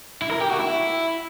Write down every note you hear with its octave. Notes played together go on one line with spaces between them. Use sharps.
E4
A#4
G4
F#4
E4